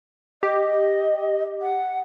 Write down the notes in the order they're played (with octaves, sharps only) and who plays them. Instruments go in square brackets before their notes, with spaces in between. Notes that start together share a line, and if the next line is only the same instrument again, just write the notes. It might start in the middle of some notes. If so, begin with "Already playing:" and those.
[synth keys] G4 [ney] D#5
[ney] F#5